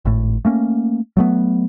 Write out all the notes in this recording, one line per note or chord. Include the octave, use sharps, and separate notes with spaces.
G#1 A2
A3 A#3 C#4
F#3 A3 B3